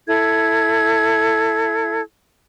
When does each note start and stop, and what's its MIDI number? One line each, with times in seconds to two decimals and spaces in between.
0.09 2.01 64
0.09 2.01 69
0.09 2.01 92